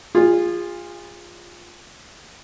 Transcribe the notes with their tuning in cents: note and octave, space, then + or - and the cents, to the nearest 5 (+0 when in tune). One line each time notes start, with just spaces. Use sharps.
F4 +0 G#4 -30